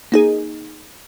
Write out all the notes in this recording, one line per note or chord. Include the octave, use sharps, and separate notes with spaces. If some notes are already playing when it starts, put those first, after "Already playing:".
A#3 D#4 G#4